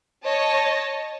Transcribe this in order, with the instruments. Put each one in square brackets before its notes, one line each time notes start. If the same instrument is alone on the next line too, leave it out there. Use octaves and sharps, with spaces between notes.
[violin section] C#5 D#5 A5